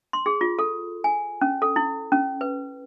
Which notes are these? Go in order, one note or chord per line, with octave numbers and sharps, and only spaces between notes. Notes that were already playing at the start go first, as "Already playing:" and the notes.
C6
G#4
F4
A4
G#5
C#4
A4
E4
C#4
B4